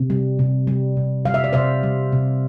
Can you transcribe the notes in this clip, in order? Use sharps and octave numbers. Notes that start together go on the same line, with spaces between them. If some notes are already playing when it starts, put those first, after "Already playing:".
Already playing: C3
G3
C3
G3
C3
G3 F5
E5
D5
C3 C5 E5
G3
C3